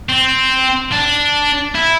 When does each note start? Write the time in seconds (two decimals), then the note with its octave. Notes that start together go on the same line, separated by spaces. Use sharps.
0.09 C4
0.92 D4
1.75 E4